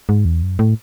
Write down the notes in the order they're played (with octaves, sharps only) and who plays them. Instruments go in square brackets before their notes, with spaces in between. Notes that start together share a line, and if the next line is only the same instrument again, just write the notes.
[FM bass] G#2
E2
F#2
A2